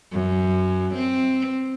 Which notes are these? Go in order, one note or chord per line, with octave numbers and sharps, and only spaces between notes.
F#2
C4